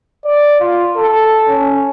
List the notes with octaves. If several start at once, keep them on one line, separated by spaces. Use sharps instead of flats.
D5
F4
A4
C#4